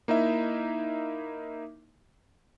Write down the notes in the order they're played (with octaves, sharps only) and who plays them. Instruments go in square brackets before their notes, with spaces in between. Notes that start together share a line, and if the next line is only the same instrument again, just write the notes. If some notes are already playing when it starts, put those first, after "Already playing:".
[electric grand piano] A#3 D#4 E4 E5